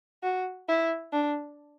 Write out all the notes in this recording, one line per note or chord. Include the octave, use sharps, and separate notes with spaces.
F#4
E4
D4